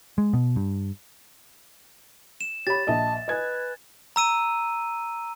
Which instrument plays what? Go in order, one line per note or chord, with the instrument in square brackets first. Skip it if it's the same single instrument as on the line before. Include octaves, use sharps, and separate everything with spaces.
[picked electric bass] G#3
B2
G2
[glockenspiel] E7
[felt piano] G4 B5 [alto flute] C#5 [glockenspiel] A6
[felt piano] A#1 D#5 E5 [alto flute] A5
[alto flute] B4 [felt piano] D#5 G#5 G#6
[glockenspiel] A#5 E6 D#7